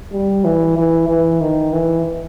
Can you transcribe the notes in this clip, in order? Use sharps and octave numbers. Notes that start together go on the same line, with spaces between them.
G3
E3
E3
E3
D#3
E3